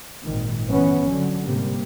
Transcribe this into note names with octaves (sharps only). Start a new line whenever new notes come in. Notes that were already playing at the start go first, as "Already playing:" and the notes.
G#1 A#2 D#3
G1 E3 B3 C#4
D3 F#3
G#2 C3 G3 A#3